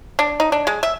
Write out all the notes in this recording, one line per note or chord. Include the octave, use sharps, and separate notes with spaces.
D4
D#4
D4
G#3
E5